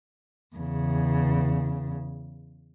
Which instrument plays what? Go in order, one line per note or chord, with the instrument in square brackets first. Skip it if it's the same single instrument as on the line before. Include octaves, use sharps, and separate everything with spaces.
[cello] E2 C#3